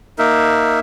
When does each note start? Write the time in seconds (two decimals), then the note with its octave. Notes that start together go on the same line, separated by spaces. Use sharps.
0.18 A#3 D#4 A#4 E5